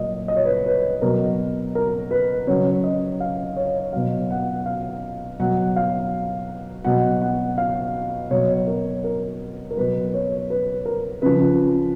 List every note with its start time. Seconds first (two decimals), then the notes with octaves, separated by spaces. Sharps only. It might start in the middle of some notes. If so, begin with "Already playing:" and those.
Already playing: A#2 F#3 D#5
0.28 D#5
0.36 C#5
0.45 B4
0.53 C#5
0.66 B4
1.02 B2 F#3 A#4
1.75 A#4
2.11 B4
2.47 C#3 F#3 C#5
2.84 D#5
3.20 F5
3.56 C#5
3.93 B2 F#3 F5
4.30 F#5
4.66 F5
5.39 B2 F#3 F#5
5.76 F5
6.85 B2 F#3 F#5
7.22 F#5
7.58 F5
8.30 B2 F#3 C#5
8.67 A#4
9.04 A#4
9.71 A#4
9.77 B2 F#3 B4
10.14 C#5
10.50 B4
10.86 A#4
11.22 C#3 F3 B4